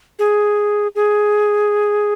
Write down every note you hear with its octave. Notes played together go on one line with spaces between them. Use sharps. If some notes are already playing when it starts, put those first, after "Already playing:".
G#4
G#4